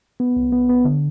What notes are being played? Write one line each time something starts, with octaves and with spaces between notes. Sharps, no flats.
B3
C2
B3
B3
D3